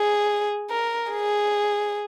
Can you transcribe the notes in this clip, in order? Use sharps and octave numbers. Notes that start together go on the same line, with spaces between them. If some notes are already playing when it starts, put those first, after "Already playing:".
Already playing: G#4
A#4
G#4